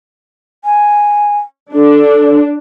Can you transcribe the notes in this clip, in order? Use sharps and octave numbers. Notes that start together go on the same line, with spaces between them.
G#5
D4 A4